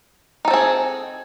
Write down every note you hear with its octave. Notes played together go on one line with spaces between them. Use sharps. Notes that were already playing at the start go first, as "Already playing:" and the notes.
C4 D#4 G#4 A4